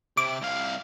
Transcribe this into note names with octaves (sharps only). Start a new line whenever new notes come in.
C3 D6
C2 F5